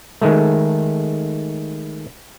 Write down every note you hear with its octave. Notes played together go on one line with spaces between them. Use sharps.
D#3 G#3 A3